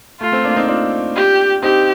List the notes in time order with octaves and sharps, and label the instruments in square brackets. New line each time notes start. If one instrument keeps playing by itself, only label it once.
[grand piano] A3 [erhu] F4
[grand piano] A3 C4
A#3 D4
C4 D#4
D4 F4
[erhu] G4
[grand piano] C4 D#4 [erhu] G4